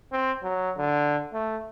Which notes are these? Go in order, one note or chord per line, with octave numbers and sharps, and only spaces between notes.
C4
F#3
D3
A3